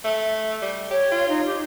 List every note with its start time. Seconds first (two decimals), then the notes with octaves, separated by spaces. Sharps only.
0.04 A3
0.62 G3
0.90 G4 C#5
1.12 F4
1.28 D#4
1.45 G4